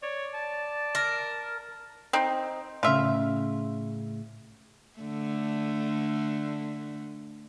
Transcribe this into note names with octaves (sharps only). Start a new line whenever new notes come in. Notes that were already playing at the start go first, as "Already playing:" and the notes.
C#5 D5
A5
A#4
C4 D#4
A2 C#3 F4 E5
D3 A3